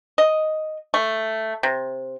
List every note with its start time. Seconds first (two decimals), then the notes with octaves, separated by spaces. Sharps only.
0.18 D#5
0.94 A3
1.63 C3